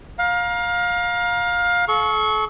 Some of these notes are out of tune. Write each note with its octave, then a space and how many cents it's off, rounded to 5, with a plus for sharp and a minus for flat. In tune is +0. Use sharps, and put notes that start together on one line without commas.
F5 +25 A#5 +30
A4 -40 C#6 +0